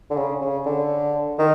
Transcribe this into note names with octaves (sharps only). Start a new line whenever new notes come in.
D3
C#3
C#3
D3
D#3